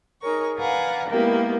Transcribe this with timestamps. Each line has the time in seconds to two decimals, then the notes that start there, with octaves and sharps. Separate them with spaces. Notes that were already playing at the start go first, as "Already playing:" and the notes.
0.21 D#4 G#4 A#4 C#5 C#6
0.56 B4 D5 F5 F#5 G#5 A#5
1.08 D#3 G#3 A#3 B3 E4 G4